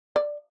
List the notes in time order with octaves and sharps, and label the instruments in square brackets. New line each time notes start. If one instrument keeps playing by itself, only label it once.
[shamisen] D5